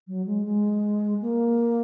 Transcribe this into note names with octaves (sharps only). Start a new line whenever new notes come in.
F#3
G#3
G#3
A#3